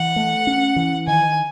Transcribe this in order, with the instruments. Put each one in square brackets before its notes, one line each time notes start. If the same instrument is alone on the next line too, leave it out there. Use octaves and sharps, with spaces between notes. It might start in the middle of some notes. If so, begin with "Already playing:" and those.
Already playing: [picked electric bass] E3 [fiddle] F#5
[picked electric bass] A3
C#4
E3
[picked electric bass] D#3 [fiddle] G#5